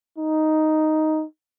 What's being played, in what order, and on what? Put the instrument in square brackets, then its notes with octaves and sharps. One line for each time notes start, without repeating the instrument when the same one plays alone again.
[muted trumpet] D#4